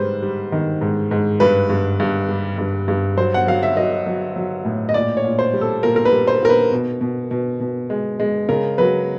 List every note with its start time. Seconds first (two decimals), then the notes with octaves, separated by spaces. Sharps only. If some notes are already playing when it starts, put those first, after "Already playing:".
Already playing: G#2 G3 B4 C5
0.22 G3
0.52 D#3
0.81 G#2
1.11 G#2
1.40 G2 B4
1.70 G2
2.00 G2
2.29 G3
2.58 G2
2.88 G2
3.17 F#3 C5
3.34 F#5
3.47 F#3 F5
3.63 E5
3.77 F#3 D#5
4.06 F#3
4.36 F#3
4.65 A2
4.89 D#5
4.94 A#2 D5
5.17 C#5
5.24 A#2
5.39 C5
5.53 G3
5.61 A4
5.83 A#2 A#4
5.96 A#4
6.05 B4
6.13 G3
6.27 C5
6.42 A#2 A#4
6.49 B4
6.72 B2
7.01 B2
7.31 B2
7.60 B2
7.90 G#3
8.20 G#3
8.49 C#3 A#4
8.78 F#3 B4